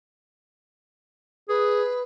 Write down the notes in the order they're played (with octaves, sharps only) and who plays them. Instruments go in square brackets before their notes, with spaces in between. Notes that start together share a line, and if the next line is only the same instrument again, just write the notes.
[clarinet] G#4 [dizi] B4